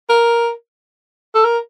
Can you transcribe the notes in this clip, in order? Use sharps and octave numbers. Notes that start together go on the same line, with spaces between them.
A#4
A4
A#4